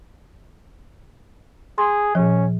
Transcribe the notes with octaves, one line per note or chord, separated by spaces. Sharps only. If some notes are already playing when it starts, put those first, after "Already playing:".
G#4 C6
A#2 F3 C#4